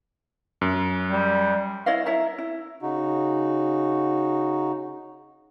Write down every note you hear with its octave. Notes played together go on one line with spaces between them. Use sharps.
F#2
G3
E4 C#5 D#5 F5
E4 C#5 E5 A#5
E4
C#3 D#4 F#4